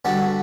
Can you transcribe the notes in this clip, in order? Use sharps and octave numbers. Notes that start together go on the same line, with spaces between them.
D3 G3 B3 F#4 A4